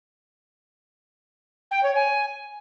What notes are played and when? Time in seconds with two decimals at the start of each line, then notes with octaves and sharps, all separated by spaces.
1.71 G5
1.83 C#5
1.95 G#5